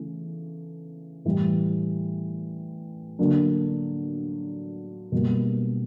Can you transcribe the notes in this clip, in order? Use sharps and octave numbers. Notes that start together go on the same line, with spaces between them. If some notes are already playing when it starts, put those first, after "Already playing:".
Already playing: C#3 E3 A3 C#4
A2 E3 G3
D3 F#3 A#3 D4
B2 G3 A#3